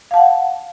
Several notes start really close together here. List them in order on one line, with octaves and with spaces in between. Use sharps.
F5 A5 F#5